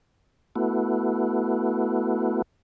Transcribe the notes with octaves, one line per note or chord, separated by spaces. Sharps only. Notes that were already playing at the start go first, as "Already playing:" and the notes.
A3 B3 E4 F#4